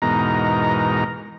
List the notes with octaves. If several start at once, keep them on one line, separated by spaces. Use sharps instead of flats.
E2 G#2 B2 D#4 A#4 A#5